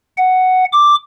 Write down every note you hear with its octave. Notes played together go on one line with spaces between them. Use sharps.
F#5
D6